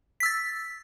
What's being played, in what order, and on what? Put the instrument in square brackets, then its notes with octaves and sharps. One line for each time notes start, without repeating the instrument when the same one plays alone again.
[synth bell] B6
E6
A6